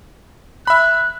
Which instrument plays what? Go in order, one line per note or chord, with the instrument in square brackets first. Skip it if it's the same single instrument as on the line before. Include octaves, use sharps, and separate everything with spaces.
[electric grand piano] E5 B5 [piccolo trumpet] F#6